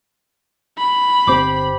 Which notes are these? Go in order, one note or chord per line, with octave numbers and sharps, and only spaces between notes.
B5
G1 C4 G4 C5 D6